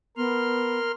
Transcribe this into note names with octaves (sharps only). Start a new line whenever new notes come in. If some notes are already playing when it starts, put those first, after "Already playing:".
B3 A#4 C6 F6